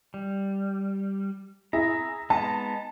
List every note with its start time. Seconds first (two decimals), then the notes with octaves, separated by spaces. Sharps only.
0.14 G3
1.73 E4 G#4 E5 A#5
2.30 G#3 B3 D#4 A5